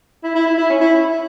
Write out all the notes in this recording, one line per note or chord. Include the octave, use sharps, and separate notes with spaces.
E4
E4
E4
E4
C#4
E4